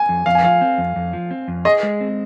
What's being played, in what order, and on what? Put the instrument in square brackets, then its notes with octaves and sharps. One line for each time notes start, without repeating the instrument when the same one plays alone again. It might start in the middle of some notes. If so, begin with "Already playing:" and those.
Already playing: [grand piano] G#5
[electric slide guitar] F2
[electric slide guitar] F2 [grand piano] F5
[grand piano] G#5
[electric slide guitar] F3 [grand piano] F5
[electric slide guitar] C4
F2
F2
F3
C4
F2
[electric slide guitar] G#4 [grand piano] D#5
[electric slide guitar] G#3
C4